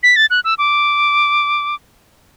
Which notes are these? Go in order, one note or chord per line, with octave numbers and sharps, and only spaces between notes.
B6
A6
F#6
E6
D6